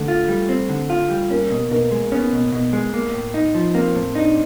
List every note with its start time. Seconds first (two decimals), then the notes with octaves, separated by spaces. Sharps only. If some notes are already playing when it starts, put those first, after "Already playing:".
Already playing: D3 A3
0.08 F4
0.28 G3
0.49 C4
0.69 D3
0.90 F4
1.10 G3
1.30 A#3 C#4
1.51 B2
1.71 B2 A#3
1.92 G#3
2.12 B3 C#4
2.32 B2
2.52 B2
2.73 G#3
2.93 A#3
3.14 A2
3.34 D#4
3.55 F3
3.75 A#3 C4
3.96 A2
4.15 D4 D#4